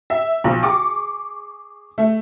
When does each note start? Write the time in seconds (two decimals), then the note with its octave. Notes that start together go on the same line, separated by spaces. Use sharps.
0.10 E5
0.44 B1 F3
0.63 G#4 C#6 D6
1.98 A3